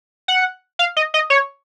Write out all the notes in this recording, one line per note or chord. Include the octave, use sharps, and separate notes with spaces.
F#5
F5
D#5
D#5
C#5